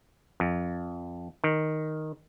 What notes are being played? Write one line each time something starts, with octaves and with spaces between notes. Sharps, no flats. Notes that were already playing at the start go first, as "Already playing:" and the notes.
F2
D#3